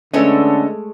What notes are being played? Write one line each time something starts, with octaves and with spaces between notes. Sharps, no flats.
D3 G#3 A3 C#4 A4 B4 C#5 D#5